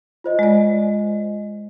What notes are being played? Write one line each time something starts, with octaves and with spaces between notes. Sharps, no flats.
F4 C5 D#5
G#3 D5